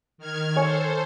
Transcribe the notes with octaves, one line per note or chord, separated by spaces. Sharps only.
D#3 F6 G#6
A4 C5 C#5 G#5